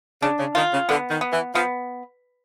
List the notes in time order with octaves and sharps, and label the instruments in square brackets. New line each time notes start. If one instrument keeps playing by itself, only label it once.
[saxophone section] C#3 [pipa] D4
[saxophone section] C#3
[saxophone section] D#3 [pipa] F4
[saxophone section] C#3
[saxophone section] D3 [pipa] B3
[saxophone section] D#3
[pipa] B3
[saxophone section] E3
[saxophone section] F3 [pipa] B3